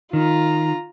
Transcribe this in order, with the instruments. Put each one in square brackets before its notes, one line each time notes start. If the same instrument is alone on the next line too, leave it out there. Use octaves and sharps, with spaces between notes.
[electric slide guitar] D#3 [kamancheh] F4 A#5